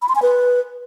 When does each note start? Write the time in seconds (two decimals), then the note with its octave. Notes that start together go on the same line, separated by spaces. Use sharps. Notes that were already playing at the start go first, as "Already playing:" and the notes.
0.02 B5
0.09 C6
0.15 G#5
0.22 B4